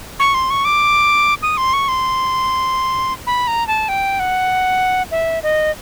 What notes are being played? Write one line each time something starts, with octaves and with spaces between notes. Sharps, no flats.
C#6
C6
C#6
D6
D#6
C6
C#6
C6
B5
A#5
A5
G5
F#5
E5
D#5